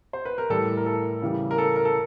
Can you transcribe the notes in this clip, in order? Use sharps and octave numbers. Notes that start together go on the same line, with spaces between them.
C5
B4
A#4
A2 E3 G3 A4
A#4
A4
C#3 E3 G3
A#4
A4
A#4
A4